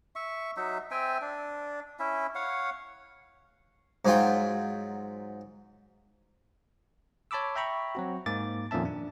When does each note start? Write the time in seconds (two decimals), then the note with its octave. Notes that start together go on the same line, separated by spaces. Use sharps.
0.16 E5 C#6
0.57 F#3 D#4 E5
0.91 C4 E5 G5 G#5
1.21 D4
1.99 C#4 E4 E5
2.35 C#5 F5 F#5
4.05 G#2 F#3 F4 G5
7.31 C#5 A5 B5 D6 E6
7.56 E5 G5 A#5 B5 C#6
7.95 F#3 C4 F#4
8.26 G#2 A#3 D6 A6
8.71 F2 A#2 D#3 C#4 E5 A5
8.85 D4